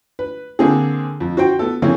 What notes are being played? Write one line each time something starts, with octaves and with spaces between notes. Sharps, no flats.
B4
D3 A#3 C4 G#4
F2
F#4 C5 G5
B3 A4
C#3 E3 F3 A#3 C4 C#4